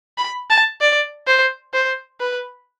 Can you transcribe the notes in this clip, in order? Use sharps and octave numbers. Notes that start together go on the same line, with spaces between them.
B5
A5
D5
C5
C5
B4